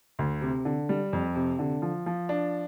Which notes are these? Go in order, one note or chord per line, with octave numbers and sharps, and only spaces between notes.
D2
C3
D3
G3
F2
C3
D3
F3
F3
D4